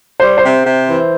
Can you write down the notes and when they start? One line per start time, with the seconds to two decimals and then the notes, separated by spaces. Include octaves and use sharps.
0.20 G3 C5
0.38 C5
0.43 C3
0.65 C3
0.88 E3